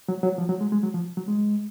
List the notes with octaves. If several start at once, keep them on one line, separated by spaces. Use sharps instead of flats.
F#3
F#3
F3
F#3
G#3
G#3
F#3
F3
F#3
G#3